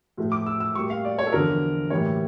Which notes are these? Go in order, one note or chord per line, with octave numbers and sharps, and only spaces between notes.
A2 F3 A3
D6
E6
E6
A2 G3 A#3 C#6
F5
D5
C#5
A4
E2 D3 F3 A#4
A2 E3 G3 A#3 C#5